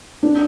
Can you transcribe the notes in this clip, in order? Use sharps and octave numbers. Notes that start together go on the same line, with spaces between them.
D4